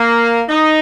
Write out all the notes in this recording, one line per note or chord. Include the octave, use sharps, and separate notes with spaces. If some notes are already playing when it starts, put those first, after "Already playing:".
Already playing: A#3
D#4